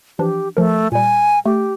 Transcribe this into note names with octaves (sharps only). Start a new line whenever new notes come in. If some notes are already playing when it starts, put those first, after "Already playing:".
E3 F3 D4 G4
F3 A3 A#4
A#2 G3 G#5
A3 G4